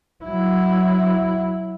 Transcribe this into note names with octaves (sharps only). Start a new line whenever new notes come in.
F#3 E4